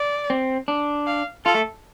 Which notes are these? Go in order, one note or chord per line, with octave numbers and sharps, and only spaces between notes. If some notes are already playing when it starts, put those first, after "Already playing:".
Already playing: D5
C4
D4
F5
F4 A4
A3